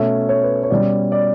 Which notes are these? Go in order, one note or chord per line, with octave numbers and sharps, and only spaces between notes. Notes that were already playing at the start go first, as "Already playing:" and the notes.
Already playing: B2 A3 C#4 E5
C#5
B4
C#5
B2 G3 C#4 D5
D5